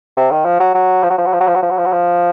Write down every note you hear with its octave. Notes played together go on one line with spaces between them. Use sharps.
C3
D#3
F3
F#3
F#3
F3
F#3
F3
F#3
F3
F#3
F3
F#3
F3
F#3
F3
F#3
F3